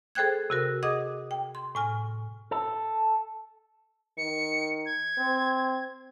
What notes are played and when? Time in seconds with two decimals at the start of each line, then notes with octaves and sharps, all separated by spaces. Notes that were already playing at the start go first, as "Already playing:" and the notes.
0.15 G#4 A4 C5 G5 F#6 G#6
0.50 C3 F#4 A#4
0.83 G#4 D#5 F#5 D6 D#6
1.31 G5
1.55 C6
1.75 A2 G#5 F6
2.51 A4
4.18 D#3 C#7
4.86 G#6
5.18 C4